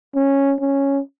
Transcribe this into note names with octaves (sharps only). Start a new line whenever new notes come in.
C#4
C#4